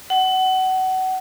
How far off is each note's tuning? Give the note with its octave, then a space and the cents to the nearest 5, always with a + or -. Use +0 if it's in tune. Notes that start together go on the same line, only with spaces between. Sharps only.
F#5 +25